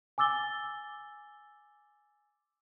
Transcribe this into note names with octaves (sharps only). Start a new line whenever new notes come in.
G#5 D6 E6 A6 G7